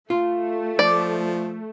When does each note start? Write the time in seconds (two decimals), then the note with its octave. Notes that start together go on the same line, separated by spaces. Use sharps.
0.10 A3 F4
0.79 F3 D5